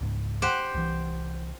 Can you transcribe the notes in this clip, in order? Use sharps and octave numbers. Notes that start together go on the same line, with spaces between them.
C#2 G#2
G4 C5 F#5
C2 E3